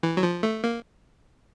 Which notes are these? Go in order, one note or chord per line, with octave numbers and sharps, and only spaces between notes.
E3
F#3
F3
A3
A#3